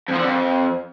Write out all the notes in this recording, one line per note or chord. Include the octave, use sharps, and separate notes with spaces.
F2
F3
D3
F2